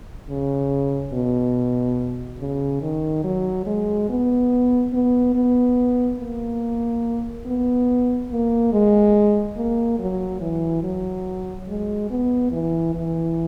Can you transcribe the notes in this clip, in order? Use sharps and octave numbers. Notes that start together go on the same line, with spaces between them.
C#3
B2
C#3
D#3
F#3
G#3
B3
B3
B3
A#3
B3
A#3
G#3
A#3
F#3
E3
F#3
G#3
B3
E3
E3